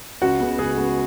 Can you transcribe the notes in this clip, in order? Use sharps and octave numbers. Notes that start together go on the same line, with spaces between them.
C#2 F#4
C#3 G#3 B3
C#2 G#4
C#3 G#3 B3